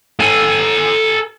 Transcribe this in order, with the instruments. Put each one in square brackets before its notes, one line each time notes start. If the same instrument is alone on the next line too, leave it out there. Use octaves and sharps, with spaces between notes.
[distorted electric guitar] A4 G#5